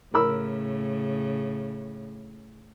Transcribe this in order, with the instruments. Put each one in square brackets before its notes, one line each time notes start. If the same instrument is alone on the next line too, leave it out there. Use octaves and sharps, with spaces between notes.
[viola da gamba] A2 C#3 [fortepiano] A#4 B5 E6